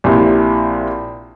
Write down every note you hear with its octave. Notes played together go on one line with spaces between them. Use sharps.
A#1 C3 E4